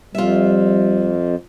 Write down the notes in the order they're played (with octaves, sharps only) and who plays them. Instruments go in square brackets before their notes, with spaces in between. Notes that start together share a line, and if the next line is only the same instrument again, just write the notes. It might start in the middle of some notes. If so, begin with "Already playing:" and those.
[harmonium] F2 [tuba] G3 [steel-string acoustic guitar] F4 E5